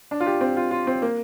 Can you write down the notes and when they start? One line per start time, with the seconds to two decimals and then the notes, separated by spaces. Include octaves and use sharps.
0.11 D4
0.20 F4
0.26 G4
0.41 C4
0.57 F4
0.71 F4
0.87 C4
1.02 A#3